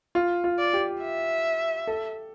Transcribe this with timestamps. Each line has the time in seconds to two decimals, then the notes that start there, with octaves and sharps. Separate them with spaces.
0.15 F4
0.44 F4
0.59 D5
0.74 G4
1.02 E5
1.87 A4